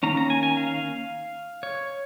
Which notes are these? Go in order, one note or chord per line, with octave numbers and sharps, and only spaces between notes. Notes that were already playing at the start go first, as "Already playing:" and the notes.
D#3 A#3 C#4 A#5
A#5
G#5
G#5
F5
C#5